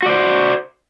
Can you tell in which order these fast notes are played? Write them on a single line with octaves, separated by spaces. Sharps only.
F#4 D5 C5